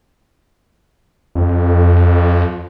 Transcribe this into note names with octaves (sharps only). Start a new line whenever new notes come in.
F2